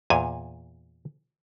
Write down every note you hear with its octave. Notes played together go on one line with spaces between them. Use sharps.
E2 A#2 G#5